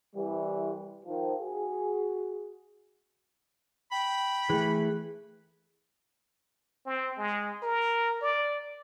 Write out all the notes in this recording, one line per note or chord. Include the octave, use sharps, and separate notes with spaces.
C2 E3 G3
D#3 F3
F#4 G#4
G5 B5
E3 A3 G#4
C4
G#3
A#4
D5